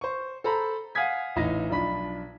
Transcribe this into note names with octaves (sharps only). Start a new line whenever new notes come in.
C5 C#6
A4 C5 A#5 B5
F5 F#5 G#5 D#6 G#6 B6
A1 D#4 A#6
B1 F3 D4 B5 B6